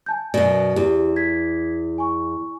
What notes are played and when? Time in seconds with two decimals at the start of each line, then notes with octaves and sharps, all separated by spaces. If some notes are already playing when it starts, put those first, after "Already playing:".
0.06 G#5 A5 G6
0.34 F#2 B2 D5
0.76 E2 G4
1.16 G#6 B6
1.98 G#5 C#6